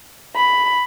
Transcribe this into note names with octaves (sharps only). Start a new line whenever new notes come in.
B5